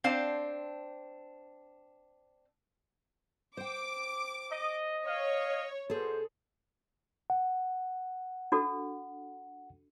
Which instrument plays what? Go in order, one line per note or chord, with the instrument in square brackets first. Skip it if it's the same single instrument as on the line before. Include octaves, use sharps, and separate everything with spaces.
[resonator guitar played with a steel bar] C4 D4 C5 F5 A5
[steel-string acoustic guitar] C5 G5 [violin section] D6
[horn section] D#5
[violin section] C#5 [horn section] D#5 F5
[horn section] B2 C5 [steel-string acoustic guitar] G#4 A4
[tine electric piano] F#5
[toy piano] D4 F#4 A4